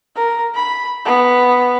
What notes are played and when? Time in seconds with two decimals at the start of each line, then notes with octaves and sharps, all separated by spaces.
0.16 A#4
0.55 B5
1.05 B3